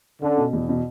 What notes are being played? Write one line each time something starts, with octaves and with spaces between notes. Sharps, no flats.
D3 C#4
B2
E2
B2